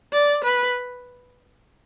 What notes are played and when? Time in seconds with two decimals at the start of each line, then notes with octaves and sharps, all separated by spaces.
0.12 D5
0.44 B4